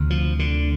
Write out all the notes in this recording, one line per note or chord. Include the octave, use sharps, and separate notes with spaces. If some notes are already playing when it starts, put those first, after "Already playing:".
Already playing: D2 C3
F3
D3